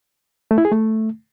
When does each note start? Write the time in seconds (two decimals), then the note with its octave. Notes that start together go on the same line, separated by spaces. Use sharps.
0.51 A3
0.58 E4
0.65 G#4
0.72 A3